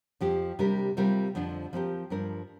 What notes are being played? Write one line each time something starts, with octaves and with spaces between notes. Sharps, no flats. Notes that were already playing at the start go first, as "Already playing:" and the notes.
F2 F3 C4 G4
C3 G3 D4 G4 A#4
C3 G3 C4 F4 A#4
F2 D3 F3 D4
F3 C4 G4 A#4
G2 F3 D4 A#4